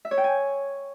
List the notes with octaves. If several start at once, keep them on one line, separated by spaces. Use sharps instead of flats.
E5
C#5
G5
G#5